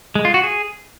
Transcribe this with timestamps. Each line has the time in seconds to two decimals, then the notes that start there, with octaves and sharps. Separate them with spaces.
0.15 G#3
0.25 F4
0.34 F#4
0.43 G#4